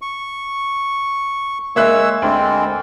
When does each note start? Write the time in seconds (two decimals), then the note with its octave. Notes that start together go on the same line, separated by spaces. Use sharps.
0.02 C#6
1.76 G#3 A#3 C#5 E5 E6 F#6
2.22 D2 G#3 C4